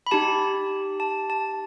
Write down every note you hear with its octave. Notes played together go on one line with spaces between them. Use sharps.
B5
D#4 G4 A5
A5
A5